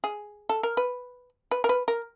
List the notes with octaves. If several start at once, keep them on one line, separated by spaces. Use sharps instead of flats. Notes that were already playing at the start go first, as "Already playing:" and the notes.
G#4
A4
A#4
B4
B4
A#4
B4
A#4